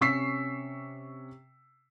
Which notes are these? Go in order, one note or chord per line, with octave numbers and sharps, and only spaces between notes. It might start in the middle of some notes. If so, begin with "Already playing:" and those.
C3 C#4 C#6 E6 B6 C7